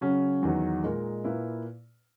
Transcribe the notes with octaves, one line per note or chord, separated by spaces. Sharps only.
C#3 F#3 C#4
E2 D#3 F#3
A#2 G#3 D#4 A#4
A#2 A#3 E4 B4